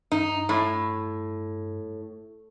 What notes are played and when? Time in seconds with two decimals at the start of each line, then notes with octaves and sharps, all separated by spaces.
0.12 G2 D#4
0.49 A2